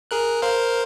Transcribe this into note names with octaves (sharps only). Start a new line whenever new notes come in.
G#4 A#4 F#6
A#4 C5 F5